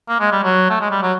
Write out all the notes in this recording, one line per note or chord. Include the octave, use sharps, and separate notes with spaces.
A#3
G#3
G3
F#3
A3
G#3
G3
F#3